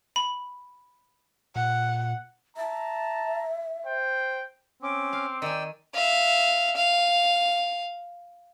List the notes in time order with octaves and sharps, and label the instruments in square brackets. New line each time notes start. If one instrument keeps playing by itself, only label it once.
[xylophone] B5
[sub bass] A#2 [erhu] F#5
[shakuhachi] E5 [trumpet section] A5 A#5
[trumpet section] C5 G5
[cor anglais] C4 [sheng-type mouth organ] C#4 [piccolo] D6
[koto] F5
[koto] D#3 G#5 [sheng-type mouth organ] D5 G5 E6
[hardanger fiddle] E5 F5
F5